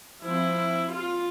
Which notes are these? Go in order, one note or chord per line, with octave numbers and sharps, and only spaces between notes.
F3 C4 E4
F4